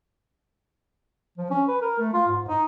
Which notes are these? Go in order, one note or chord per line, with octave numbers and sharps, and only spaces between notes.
F3
C#4
B4
A#4
A3
F4
G#2
D#4